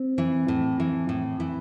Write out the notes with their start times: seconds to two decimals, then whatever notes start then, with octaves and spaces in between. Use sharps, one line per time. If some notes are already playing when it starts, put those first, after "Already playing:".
Already playing: C4
0.18 E3
0.48 A2
0.80 E3
1.09 A2
1.40 E3